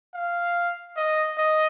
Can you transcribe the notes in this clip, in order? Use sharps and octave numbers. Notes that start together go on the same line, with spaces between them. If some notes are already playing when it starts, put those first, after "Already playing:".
F5
D#5
D#5